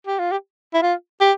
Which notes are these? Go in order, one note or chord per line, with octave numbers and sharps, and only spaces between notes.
G4
F4
G4
E4
F4
G4